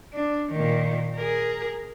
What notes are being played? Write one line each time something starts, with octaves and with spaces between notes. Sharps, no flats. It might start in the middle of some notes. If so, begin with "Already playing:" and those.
D4
A#2 D#3
G#4 A#4